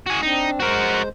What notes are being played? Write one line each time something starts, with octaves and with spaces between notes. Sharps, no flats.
F#4 G#4
C4 D4 D#4
G#3 F#4 A#4 C5